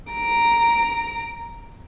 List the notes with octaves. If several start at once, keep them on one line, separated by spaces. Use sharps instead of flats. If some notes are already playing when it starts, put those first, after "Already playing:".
A#5 D7